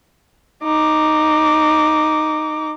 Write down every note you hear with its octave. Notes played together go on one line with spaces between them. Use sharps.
D#4 D6